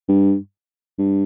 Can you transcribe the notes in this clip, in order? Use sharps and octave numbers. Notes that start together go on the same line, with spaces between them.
G2
G2